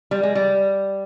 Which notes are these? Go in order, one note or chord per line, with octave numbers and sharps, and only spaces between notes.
G3
G#3
G3